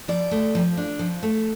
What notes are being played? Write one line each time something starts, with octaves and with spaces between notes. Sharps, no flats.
F3 D5
A3
F3
D4
F3
A3